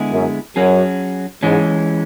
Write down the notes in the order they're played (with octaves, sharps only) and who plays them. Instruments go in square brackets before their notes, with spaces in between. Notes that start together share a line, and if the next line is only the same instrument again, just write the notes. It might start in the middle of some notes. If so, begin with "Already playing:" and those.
Already playing: [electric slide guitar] D3 G#3 B3 E4 G#4
[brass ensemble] F#2
[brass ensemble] F#2 [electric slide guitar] F#3 C#4 G#4
[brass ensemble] G#2 [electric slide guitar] E3 G#3 C#4